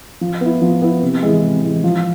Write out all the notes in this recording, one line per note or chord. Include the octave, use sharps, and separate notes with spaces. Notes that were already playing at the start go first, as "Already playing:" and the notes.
F3
B3 E4
F3
B3 E4
C3
E3 G#3
C3
E3 G#3
F3